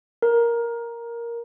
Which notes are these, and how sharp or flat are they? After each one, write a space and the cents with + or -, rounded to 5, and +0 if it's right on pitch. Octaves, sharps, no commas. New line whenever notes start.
A#4 +5